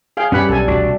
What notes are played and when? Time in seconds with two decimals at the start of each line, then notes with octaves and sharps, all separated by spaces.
0.17 G#4 F5 G5
0.32 F#2 G3 C#4 G4 B4 C#5 F#5 B5
0.49 B1 A4 G#5
0.68 E1 C2 A3 C4 D4 F#4 D5